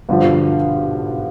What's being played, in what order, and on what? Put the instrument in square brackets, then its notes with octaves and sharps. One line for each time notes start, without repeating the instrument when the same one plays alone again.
[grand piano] G2 D3 F3 [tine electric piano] B2
[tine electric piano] B2
G#2